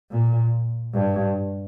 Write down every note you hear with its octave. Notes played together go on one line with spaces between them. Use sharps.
A#2
G2